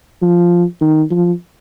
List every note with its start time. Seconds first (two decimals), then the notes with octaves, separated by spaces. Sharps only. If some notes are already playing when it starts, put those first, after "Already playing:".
0.22 F3
0.81 D#3
1.11 F3